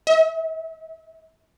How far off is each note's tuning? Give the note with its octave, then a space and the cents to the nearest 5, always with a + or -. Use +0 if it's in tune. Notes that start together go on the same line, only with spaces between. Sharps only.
E5 -40